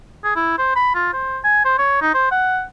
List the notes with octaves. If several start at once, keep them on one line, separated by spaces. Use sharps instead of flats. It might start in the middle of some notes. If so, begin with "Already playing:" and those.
G#4
E4
C5
B5
F4
C5
G#5
C5
C#5
D#4
C5
F#5